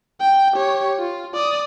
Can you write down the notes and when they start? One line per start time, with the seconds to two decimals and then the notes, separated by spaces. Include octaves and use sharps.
0.21 G5
0.54 G4 C#5
0.99 F4
1.34 D5 D#6